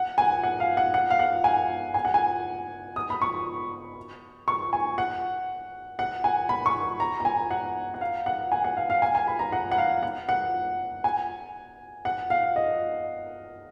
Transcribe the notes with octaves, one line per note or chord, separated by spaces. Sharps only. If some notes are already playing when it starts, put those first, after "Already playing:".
Already playing: F#5
G#5
F#5
F5
F#5
F#5
F5
F#5
G#5
G#5
F#5
G#5
D#6
B5
C#6
C#6
G#5
F#5
F#5
G#5
B5
C#6
A#5
A#5
G#5
F#5
F#5
F5
F#5
G#5
F#5
F5
F5
G#5
G#5
B5
A#5
F#5
F#5
F5
F#5
F#5
G#5
F#5
F5
D#5